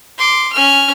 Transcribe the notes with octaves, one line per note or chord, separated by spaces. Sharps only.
C6 D6
C#4 F6